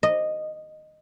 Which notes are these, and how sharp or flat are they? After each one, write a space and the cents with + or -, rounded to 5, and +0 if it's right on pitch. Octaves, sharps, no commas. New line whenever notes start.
D#5 -10